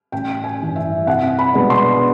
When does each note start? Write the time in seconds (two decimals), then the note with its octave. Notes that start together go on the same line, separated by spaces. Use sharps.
0.12 A1 G5
0.44 G#5
0.60 G2 E3 G3
0.76 E5
1.07 C2 F#5
1.39 B5
1.54 B2 G#3 B3 D4
1.70 C6